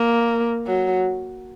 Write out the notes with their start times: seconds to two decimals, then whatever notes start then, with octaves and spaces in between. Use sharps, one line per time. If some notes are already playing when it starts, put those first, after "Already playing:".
Already playing: A#3
0.67 F#3